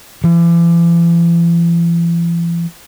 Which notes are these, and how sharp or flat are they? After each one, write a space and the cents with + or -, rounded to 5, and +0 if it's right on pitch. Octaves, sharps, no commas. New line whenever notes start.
E3 +45